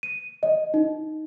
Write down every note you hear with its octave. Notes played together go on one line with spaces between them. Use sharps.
D#7
D#5
D#4